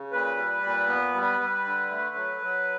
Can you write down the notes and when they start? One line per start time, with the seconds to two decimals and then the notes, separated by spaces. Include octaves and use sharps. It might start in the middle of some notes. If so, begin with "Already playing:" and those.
Already playing: C#3
0.12 A#2 B4
0.36 G3
0.63 A#2
0.88 B3
1.14 G3
1.40 G3
1.65 D3
1.90 A3
2.16 F#3
2.42 F#3